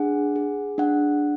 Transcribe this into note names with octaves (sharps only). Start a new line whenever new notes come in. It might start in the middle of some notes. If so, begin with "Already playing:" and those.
Already playing: D4 G#4 F#5
G#4
D4 F#5